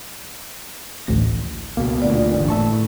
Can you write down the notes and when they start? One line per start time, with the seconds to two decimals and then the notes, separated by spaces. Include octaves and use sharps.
1.07 A1 D2 A#6
1.77 C#2 B2 A#3
2.02 D2 A#2 D5
2.35 G1 D3 E3
2.48 A2 E5 A5 C#6